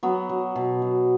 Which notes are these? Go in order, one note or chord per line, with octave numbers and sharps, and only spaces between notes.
F#3 B3
F#3
B2
F#3